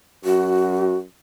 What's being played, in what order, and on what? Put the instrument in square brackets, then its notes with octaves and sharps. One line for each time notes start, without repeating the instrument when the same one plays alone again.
[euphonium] F#2 [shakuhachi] F#4